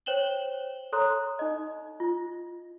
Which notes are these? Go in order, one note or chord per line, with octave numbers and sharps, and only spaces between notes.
C5 C#5 G5 E7 F#7 G7
A4 C#5 A#5 C6 D#6 F#6
D#4 D#5
F4